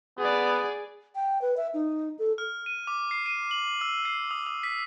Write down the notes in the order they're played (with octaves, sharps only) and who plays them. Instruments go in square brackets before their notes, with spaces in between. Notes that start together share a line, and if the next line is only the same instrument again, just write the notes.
[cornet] B3 [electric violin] G#4 D5
[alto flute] G5
B4
E5
D#4
A4
[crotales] F6
D#7
D6
C7
D#7
F#7
E6
C7
D#6
D#6
B6